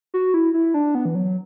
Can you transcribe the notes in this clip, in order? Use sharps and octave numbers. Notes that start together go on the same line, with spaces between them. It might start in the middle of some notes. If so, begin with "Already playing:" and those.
F#4
E4
E4
D4
B3
E3
F#3